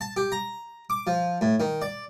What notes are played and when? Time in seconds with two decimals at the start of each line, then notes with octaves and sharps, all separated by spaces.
0.01 A5
0.17 G4
0.32 A#5
0.90 D6
1.07 F3
1.41 A2
1.60 D#3
1.82 D5